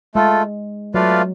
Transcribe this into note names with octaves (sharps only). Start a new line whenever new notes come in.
G#3 A3 F4 A4
F#3 A3 F4 B4 D5 F5